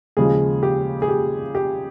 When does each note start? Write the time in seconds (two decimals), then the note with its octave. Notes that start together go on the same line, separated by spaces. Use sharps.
0.17 D#2 C#3 F3 G#3 G#4
0.63 G4
1.02 G#4
1.08 G4
1.55 G4